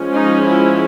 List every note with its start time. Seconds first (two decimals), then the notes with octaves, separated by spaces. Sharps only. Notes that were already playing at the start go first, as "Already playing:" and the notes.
Already playing: F3 G#3 C#4
0.13 D#4
0.44 E4